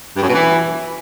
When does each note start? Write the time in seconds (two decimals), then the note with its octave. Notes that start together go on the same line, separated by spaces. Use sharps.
0.16 G2
0.22 F#2
0.28 B2
0.34 E3